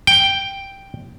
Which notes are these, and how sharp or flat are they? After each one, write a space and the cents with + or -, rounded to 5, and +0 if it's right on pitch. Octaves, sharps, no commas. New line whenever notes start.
G5 +0